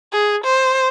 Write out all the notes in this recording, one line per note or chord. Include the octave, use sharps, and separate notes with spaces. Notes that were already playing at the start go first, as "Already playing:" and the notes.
G#4
C5